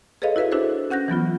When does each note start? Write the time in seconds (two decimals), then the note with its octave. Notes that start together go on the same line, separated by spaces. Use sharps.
0.22 G#4 A4 B4 C#5 D#5 F5
0.36 E4 F#4 B4 E5 F5
0.52 D4 E4 F#4 A4 B4 C5
0.90 C#4 F#5 F#6 G6 A#6
1.08 E3 F#3 B3 F4